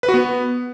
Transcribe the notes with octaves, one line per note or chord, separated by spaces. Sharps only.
B4
F#4
B3